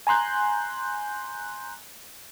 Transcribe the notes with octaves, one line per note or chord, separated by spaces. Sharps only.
G#5 A#5 C6 F#6 G6